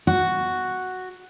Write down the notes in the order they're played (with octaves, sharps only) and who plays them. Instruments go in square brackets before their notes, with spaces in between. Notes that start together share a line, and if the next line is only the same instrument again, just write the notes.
[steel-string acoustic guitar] F#4